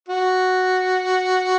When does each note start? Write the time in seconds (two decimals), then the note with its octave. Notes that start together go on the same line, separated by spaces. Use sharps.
0.08 F#4